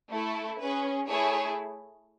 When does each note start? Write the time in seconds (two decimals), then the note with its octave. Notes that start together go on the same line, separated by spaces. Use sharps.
0.10 A3 E4 A4
0.59 C#4 G#4 B4
1.08 A3 E4 G#4 C#5